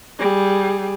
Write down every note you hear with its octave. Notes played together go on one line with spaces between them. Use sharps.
G3 G#4